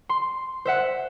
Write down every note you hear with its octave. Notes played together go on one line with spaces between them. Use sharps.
C6
C5 E5 F#5